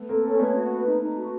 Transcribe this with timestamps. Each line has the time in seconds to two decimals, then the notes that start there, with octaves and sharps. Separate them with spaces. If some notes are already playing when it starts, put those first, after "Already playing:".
Already playing: A3 B3
0.09 A#3 C4 A4
0.24 C#4
0.39 A3 B3 C#5
0.55 F#4
0.71 B4
0.86 D#4
1.01 D#4
1.17 F#4